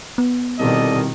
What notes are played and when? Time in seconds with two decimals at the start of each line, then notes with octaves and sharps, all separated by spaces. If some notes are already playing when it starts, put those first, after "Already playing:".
0.18 B3
0.59 C2 B2 D#3 A4 D5 D#5